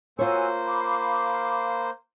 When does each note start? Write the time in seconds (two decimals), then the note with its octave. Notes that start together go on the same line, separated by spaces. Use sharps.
0.19 A#3 F4 F#4 C5 C#5 G#5 E6
0.65 F5 B5 D6